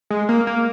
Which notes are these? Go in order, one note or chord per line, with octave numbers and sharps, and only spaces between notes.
G#3
A#3
A#3